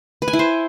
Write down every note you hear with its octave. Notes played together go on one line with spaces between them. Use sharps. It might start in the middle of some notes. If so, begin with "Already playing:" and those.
B4
G#5
E4
C5